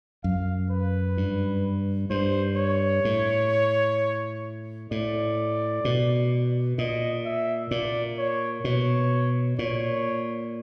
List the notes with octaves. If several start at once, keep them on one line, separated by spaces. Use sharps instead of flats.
F#2 F5
B4
G2
G2 C5
C#5
A2
A2 D5
B2
A#2 D#5
E5
A#2 D5
C#5
B2 C#5
A#2 C#5